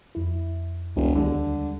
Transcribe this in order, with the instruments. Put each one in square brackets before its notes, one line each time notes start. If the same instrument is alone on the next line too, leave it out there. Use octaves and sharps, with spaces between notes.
[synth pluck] F2 E4
[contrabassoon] E1 [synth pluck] C#2
[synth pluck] D#2 G3 G#3 [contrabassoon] D3